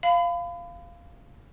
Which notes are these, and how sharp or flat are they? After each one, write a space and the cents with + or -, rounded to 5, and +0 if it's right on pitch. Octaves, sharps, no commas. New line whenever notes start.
F5 -10 B5 +30